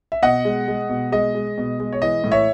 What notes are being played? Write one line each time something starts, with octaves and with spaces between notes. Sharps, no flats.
E5
B2 D#5 F#5
G#3
G#3
B2
G#3 D#5
G#3
B2
G#3
C#5
E3 D#5
A2
C#5 E5